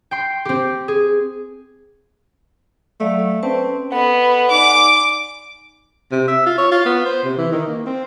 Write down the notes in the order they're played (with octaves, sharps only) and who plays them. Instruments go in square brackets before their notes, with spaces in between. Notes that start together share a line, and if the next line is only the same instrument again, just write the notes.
[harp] G5 C6
C4 G4
G#4
[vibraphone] F#3 D5 F5 [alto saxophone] A3
[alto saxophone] C4 [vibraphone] C#4 B4 A5
[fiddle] B3 [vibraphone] A4 D#5 [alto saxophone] F#5
[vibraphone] D#4 D5 G#5 [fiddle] D6
[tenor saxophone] C3
E5
F4
C#5
F4
B3
C5
C3
E3
D#3
A#3
C4